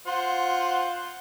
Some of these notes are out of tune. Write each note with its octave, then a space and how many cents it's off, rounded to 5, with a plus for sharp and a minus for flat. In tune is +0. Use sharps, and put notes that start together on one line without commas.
F4 +15 C5 +0 F#5 +0